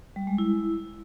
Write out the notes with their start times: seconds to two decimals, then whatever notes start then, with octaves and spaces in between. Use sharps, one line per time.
0.16 G3
0.27 G#3
0.38 E4